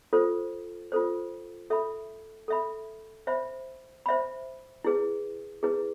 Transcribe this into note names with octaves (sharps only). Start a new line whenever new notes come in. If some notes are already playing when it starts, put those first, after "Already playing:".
F4 A4 C5
F4 A4 C5
A4 E5 B5
A4 E5 B5
C5 E5 B5
C5 E5 B5
E4 G#4 B4
E4 G#4 B4